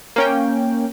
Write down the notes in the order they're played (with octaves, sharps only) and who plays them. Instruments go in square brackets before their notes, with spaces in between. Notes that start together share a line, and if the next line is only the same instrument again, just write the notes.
[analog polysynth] A#3 C#4 G5